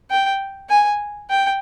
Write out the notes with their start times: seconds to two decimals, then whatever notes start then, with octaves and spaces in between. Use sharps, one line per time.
0.11 G5
0.70 G#5
1.30 G5